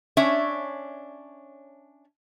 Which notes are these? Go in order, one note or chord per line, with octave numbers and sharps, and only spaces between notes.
C#4 D4 C#5 E5